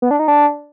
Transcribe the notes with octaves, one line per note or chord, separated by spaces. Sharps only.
B3
D4
D#4
D4